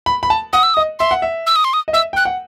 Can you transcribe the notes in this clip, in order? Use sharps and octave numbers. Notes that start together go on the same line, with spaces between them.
B5
B5
A5
F#5 D#6
E6
D#6
D#5
E5 C6
F#5
E5
E6
D#6
C6
D#6
D#5
E5 E6
G5 F#6
F#5